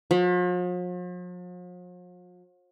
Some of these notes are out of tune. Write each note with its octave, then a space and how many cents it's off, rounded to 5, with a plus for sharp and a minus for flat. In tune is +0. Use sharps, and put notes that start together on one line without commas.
F3 +45